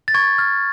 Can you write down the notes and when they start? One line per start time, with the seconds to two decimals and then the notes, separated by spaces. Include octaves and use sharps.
0.08 A6
0.14 C#6 G#6
0.38 F6